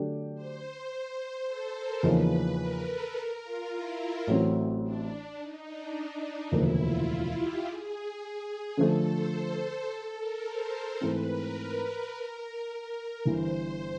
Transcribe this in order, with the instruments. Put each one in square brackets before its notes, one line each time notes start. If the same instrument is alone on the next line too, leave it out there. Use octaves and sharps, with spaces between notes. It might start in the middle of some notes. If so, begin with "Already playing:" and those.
Already playing: [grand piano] D3 F#3 A3 D4 G4
[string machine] C5
C5
A4
A#4
[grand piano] E2 C#3 F3 A#3 D#4 [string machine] B4
[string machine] A#4
A4
A#4
F4
E4
[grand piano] A1 A2 F#3 A3 C4
[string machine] D4
D4
D#4
D4
D4
D#4
[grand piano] E1 D2 C#3 F3 A#3 [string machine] E4
[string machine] F4
F4
G4
G#4
[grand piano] D3 F3 A3 [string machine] A4
[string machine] C5
C5
C5
A4
A#4
C5
C5
[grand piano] G#2 E3 A3 C4 D#4 [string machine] B4
[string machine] A#4
A#4
A#4
[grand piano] G1 G2 E3 [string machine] C5
[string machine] C5